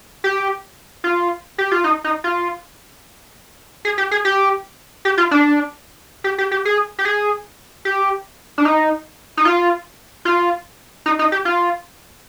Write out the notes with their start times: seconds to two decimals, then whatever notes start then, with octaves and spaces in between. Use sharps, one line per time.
0.24 G4
1.04 F4
1.58 G4
1.72 F4
1.84 D#4
2.04 D#4
2.24 F4
3.85 G#4
3.98 G4
4.11 G#4
4.25 G4
5.05 G4
5.18 F4
5.31 D4
6.24 G4
6.38 G4
6.51 G4
6.65 G#4
6.99 G4
7.05 G#4
7.85 G4
8.58 D4
8.65 D#4
9.37 D#4
9.45 F4
10.25 F4
11.06 D#4
11.19 D#4
11.32 G4
11.45 F4